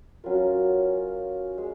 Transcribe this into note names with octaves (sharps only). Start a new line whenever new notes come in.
F#3 C#4 F4 A#4
G#3